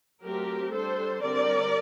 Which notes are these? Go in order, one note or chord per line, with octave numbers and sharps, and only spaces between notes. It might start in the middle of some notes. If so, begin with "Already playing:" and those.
F#3 A3 C4 G4 A#4
G3 D4 A4 C5
D3 G3 C4 A#4 D5